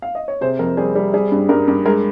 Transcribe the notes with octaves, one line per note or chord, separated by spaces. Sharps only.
F5
D#5
C#5
C3 G#4 C5
F2 A#4
G3 G#4 C5
G3
G3 G#4
G2
G2 A#4
G2
G#3 A#4